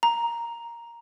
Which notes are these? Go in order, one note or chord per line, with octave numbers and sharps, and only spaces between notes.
A#5